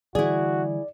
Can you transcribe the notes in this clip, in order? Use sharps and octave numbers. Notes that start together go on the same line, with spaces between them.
D3 E3 G3 E4 F#4 G#4 D5